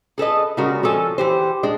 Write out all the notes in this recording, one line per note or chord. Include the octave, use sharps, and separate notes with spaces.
G#4 A4 B4 D#5
C#3 G3 G#3 F#4 A#4
F3 F#4 A4 G#5
E3 G4 C5
G#3 D4